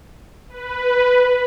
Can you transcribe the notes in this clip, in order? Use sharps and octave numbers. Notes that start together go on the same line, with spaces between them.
B4